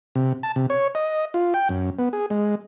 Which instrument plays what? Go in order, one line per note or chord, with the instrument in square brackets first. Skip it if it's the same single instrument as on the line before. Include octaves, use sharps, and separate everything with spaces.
[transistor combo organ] C3
A5
C3
C#5
D#5
F4
G5
F#2
B3
G#4
G#3